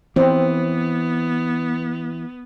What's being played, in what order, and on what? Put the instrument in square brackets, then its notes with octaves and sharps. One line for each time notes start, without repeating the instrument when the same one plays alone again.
[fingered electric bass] E3 [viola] B3 [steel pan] C4